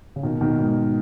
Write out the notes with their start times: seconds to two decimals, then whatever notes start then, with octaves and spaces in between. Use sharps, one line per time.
0.16 C#3
0.23 B2 D#3
0.41 B2 D#3
0.59 G#2